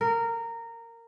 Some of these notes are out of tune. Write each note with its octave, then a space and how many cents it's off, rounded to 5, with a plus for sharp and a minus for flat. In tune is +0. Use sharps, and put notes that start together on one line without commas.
A#4 -15